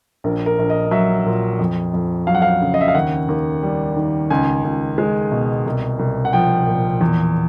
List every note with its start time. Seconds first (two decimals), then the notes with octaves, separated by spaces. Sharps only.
0.24 A#1 A#4
0.46 A#4
0.59 A#1
0.70 D#5
0.91 F#3 E5
1.26 A#2
1.59 F2
1.94 F2
2.27 F#3 F5
2.35 F#5
2.42 F5
2.61 C#3
2.74 D#5
2.81 E5
2.88 F5
2.95 D#2 F#5
3.29 D#2
3.63 G3
3.97 D#3
4.30 C#2 G#5
4.64 C#2
4.98 G#3
5.32 B2
5.66 C2
5.99 C2
6.25 F#5
6.33 F3 G5
6.67 A#2
7.01 E2